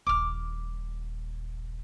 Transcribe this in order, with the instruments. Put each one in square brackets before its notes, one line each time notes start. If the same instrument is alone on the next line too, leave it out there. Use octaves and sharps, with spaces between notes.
[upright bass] D#1 A#1 [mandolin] D6 F6